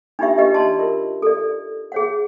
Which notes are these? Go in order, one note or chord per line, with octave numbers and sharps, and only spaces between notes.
D4 D#4 F4 G4 E5
G4 B4 D#5
G4 D5 A5 C6
F4 A#4
A4 D5
G#4 C#5 F#5